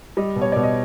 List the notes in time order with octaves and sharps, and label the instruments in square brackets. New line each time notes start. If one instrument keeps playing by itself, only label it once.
[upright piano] G3 D#5
B2
C#5
B2 D5
D#5